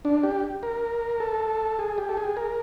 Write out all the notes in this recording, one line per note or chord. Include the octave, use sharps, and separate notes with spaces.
D4
G4
A#4
A4
G#4
G4
A4
G#4
A#4